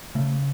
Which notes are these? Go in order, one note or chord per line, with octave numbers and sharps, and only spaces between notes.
C#3 A3